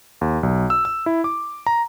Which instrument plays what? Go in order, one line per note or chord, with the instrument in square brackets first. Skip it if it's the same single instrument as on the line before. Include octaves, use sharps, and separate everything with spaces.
[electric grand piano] D#2
B1
E6
E6
E4
D6
A#5